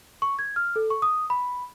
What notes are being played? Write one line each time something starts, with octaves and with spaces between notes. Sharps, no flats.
C#6
G#6
F6
A4
C#6
D#6
B5